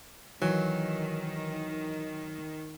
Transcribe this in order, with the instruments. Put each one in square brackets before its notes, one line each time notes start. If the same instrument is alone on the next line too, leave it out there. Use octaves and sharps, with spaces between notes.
[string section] D#3 [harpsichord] E3 [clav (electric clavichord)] F#3